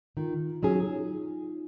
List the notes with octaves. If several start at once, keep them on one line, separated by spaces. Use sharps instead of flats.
D#3 F4
F#3 C#4 D#4 G#4